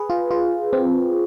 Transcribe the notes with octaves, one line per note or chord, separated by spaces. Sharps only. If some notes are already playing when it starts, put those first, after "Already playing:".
Already playing: G#4 B4
F4
F4
C4